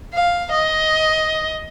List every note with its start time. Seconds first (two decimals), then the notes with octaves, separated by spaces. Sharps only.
0.14 F5
0.51 D#5